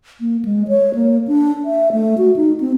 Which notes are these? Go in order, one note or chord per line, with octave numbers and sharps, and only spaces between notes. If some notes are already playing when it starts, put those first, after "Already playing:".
A#3
G#3
C#5
A#3
D4
E5
A3
F#4
D#4
C4